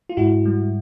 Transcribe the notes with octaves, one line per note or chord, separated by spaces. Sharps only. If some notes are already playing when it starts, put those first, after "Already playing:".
F4
G#2 E4 F#4
G3